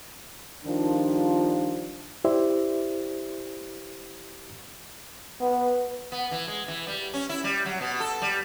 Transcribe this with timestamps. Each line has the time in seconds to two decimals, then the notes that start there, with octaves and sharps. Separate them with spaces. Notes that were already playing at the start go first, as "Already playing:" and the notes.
0.65 D#3 F3 G3 D4 F4
2.24 E4 G4 C5 D5 E5
5.40 B3 B4
6.12 B3
6.31 E3
6.48 G#3
6.68 E3
6.87 G3
7.13 C#4
7.29 E4
7.44 G3
7.65 F#3
7.81 B2
8.00 A4
8.22 G3